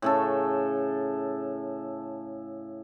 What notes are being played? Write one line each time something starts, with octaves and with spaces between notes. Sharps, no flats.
A2 C#3 A4